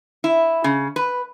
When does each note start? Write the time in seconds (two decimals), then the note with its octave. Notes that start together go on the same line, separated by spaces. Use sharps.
0.24 E4
0.64 C#3
0.96 B4